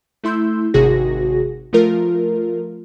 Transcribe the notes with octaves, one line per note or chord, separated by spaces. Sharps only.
A3 E4 C6 E6 G6
G#1 C3 F#4 G#4 A#6
F3 A3 F4 A#4